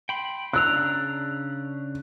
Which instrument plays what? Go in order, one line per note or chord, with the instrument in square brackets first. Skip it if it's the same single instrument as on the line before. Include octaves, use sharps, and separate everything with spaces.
[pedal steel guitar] G5 B5 C6
[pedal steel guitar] C#3 D4 A#5 [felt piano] E6 F#6